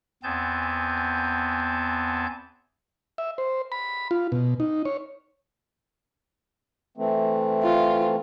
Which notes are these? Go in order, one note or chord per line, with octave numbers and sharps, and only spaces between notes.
E2 B3 C4 G#5 A5 G6
E5
C5
B5
F4
B2
D#4
C#5
E3 A3 C4
F4